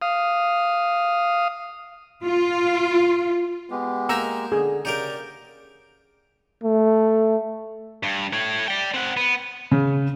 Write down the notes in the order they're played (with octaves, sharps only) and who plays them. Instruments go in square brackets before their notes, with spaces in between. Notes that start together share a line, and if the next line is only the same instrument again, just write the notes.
[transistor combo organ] F5 D#6
[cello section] F4
[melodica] G#3 G4 [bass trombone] B3
[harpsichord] A#3 D#4 E5 [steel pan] A#5 E6
[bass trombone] D3 [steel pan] G#4
[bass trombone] C#3 [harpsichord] D#4 G4 A#4 [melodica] D5
[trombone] A3
[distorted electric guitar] G2
A3 C#5
D5 G5
C4 F#5
B3
[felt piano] C#3